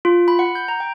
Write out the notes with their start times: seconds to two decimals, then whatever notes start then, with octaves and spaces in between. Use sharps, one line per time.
0.05 F4
0.28 B5
0.39 F#5
0.55 G6
0.68 A#5
0.80 G5